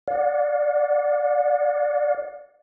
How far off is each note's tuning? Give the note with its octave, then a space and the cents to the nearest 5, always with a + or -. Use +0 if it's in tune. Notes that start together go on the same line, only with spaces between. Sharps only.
D5 +0 F#5 -40